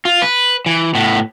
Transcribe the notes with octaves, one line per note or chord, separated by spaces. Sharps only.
F4
B4
E3
A2 B3